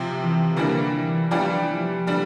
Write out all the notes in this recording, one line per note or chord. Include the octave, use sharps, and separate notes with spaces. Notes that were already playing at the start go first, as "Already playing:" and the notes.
Already playing: C3 F3 C4
E3
D3 E3 G3 A#3 D4
E3
E3 F3 G3 D4 G4
F3
D3 G3 D4